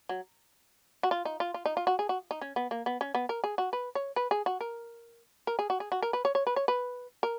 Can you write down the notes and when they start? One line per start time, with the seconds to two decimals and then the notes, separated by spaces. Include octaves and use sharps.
0.09 F#3
1.03 F#4
1.11 F4
1.25 D#4
1.40 F4
1.54 F4
1.66 D#4
1.77 F4
1.87 F#4
1.99 G#4
2.09 F#4
2.31 D#4
2.41 C#4
2.56 B3
2.71 A#3
2.86 B3
3.01 C#4
3.15 B3
3.29 A#4
3.44 G#4
3.58 F#4
3.73 B4
3.95 C#5
4.16 B4
4.31 G#4
4.46 F#4
4.61 A#4
5.47 A#4
5.59 G#4
5.70 F#4
5.80 G#4
5.92 F#4
6.02 A#4
6.13 B4
6.25 C#5
6.35 C#5
6.47 B4
6.56 C#5
6.68 B4
7.23 A#4